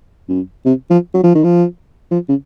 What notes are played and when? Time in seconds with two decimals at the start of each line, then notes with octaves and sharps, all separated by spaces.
0.29 F#2
0.66 C3
0.91 F3
1.14 F#3
1.24 F3
1.35 D#3
1.44 F3
2.11 F3
2.29 C#3